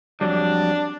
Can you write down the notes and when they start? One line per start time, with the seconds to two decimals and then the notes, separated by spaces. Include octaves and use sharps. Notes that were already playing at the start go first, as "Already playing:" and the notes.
0.21 F2 F#3 G3 D4